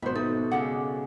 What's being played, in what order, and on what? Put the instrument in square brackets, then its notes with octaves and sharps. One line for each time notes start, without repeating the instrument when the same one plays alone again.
[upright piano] G#1 B2 B3 [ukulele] C5 E5 [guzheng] B5
[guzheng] A3 [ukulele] D#4 [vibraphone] A4
[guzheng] C#3 G#3 A4 [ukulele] F#5 [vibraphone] D6